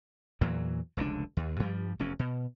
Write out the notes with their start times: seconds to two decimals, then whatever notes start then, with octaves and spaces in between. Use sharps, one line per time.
0.41 E2 A#2 E3 F#3
0.97 F1 C#2 D3 D4
1.37 D#2
1.60 G2 F3 G3
1.99 F1 E2 C#4
2.19 B2